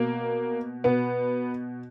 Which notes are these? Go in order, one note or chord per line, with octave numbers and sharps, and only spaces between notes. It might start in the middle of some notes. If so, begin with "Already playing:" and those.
Already playing: B2 A#3
B2 B3